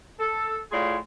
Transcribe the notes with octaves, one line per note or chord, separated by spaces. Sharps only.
A4
A2 F4 G#4 D5 C6